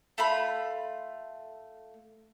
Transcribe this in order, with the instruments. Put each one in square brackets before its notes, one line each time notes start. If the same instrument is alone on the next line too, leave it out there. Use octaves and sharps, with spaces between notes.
[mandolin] A3 F4 B5